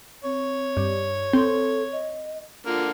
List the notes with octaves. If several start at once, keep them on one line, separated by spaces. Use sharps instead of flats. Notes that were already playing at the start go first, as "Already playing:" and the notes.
C4 C#5
G2
C4 A4
D#5
D3 A#3 F4 F6